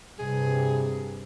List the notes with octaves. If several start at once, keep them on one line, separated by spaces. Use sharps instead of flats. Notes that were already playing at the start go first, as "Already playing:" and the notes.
G2 C3 G#4